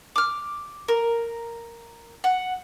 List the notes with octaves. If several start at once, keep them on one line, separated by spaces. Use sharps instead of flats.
D6 F6
A#4
F#5